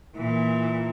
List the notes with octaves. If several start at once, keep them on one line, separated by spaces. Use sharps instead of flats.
A#2 E3